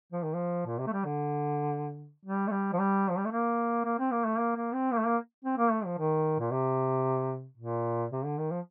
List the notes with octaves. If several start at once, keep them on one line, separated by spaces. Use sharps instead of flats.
F3
D#3
F3
A#2
C3
A3
G3
D3
G3
A3
G3
F3
G3
F3
G3
A3
A#3
A#3
C4
A#3
A3
A#3
A#3
C4
A#3
A3
A#3
C4
A#3
A3
F3
D#3
A#2
C3
A#2
C3
D3
D#3
F3